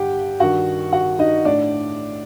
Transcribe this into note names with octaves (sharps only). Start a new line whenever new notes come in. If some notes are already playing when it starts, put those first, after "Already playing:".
Already playing: G2 D3 G4 F#5 G5
G2 D#3 F#4 F#5
F#4 F#5
D#4 D#5
A2 D4 D5